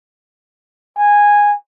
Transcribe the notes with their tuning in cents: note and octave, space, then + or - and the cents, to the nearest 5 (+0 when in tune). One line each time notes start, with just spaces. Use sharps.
G#5 -10